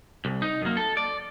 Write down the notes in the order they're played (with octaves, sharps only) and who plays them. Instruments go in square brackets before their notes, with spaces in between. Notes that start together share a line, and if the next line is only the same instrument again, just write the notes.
[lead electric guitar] C2
D#4
F#2 A#3
A4
D5